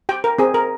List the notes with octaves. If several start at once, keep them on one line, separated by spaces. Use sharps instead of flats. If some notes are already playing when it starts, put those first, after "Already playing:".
G4 G5
A#4
C4 G#4
A#4